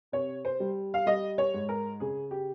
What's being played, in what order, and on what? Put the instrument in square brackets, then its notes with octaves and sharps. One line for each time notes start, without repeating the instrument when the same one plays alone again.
[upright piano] C3 C#5
C5
G3
F5
G3 D#5
C#5
G#2
A#4
C#3 G#4
G4